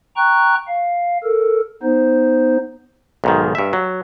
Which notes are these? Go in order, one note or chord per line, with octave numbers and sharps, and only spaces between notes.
G5 A#5 C#6 F#6
F5
A4 A#4
B3 D#4 C5
B1 G#2 D#3
G2 E5
F#3